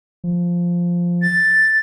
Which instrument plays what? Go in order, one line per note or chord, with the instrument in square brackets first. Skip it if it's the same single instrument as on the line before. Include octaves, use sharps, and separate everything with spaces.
[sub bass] F3
[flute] A6